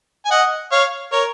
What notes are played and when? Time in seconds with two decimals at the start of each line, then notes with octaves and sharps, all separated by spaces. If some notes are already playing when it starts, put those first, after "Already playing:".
0.25 G#5
0.31 D#5 F#5
0.72 C#5 F5
1.12 A#4 C#5